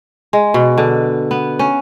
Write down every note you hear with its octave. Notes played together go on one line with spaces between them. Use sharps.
G#3
B2
D3
B3
C#4